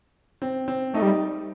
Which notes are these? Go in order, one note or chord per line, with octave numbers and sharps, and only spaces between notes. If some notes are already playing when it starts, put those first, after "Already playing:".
C4
C4
A3 D#4
G3